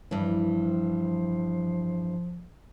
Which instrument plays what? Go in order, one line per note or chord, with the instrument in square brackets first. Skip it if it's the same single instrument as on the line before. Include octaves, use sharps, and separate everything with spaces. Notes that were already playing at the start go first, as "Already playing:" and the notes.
[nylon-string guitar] G2 E3 [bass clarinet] F3